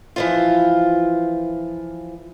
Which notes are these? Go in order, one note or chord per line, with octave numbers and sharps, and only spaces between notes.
E3 F3 F4